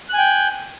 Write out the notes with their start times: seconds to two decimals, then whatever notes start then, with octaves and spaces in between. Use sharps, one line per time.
0.09 F#6
0.14 G#5
0.18 G5